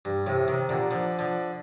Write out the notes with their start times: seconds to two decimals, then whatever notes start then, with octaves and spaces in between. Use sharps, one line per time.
0.05 G2
0.27 A2 C3
0.48 C3 D#3
0.69 A#2 D3
0.91 D3 F3
1.19 D3 F3